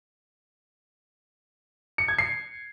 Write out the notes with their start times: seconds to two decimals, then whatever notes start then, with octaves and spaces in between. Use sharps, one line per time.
1.98 C#7
2.08 G#6
2.19 C7